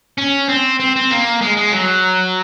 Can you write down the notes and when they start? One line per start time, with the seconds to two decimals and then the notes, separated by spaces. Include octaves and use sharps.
0.18 C#4
0.49 C4
0.80 C4
0.96 C4
1.11 A#3
1.41 G#3
1.57 G#3
1.72 F#3